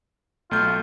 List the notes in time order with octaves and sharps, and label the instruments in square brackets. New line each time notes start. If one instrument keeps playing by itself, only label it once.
[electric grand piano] B1 A3 G6 [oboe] F4